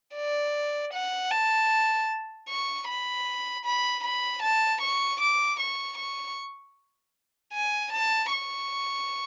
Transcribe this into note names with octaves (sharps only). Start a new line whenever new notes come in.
D5
F#5
A5
C#6
B5
B5
B5
A5
C#6
D6
C#6
C#6
G#5
A5
C#6